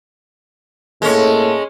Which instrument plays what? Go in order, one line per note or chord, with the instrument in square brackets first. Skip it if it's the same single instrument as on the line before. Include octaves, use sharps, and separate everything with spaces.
[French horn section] A2 A#3 A4 [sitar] G#3 C#4